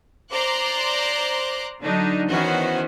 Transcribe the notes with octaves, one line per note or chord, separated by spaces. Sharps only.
C5 D5 A#5 C6 D6 F#6
D3 F#3 D4 D#4
D#3 E3 B3 C#4 F#4 C5